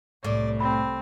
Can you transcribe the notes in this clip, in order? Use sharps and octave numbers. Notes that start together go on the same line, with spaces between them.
C2 A2 A3 D5
C4 B5